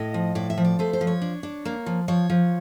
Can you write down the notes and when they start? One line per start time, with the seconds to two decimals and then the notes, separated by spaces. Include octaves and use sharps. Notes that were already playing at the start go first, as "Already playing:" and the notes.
Already playing: A2 D#5
0.14 F3
0.35 A2 D5
0.50 E5
0.58 F3
0.65 D5
0.79 A3 C5
0.93 C5
1.01 F3
1.07 C#5
1.22 D4
1.43 D4
1.65 A#3
1.86 F3
2.08 F3 C#5
2.30 F3